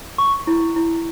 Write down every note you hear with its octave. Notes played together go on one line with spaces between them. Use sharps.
C#6
E4
E4